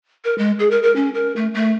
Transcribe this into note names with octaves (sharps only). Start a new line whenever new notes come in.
A#4
G#3
G#4
A#4
A#4
C#4
A#4
A3
A3